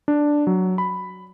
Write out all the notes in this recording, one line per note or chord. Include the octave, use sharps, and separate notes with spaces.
D4
F#3
B5